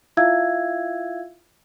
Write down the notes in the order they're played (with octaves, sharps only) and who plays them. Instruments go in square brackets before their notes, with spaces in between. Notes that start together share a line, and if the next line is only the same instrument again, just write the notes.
[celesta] E4 F4 E5 F5 E6 G#6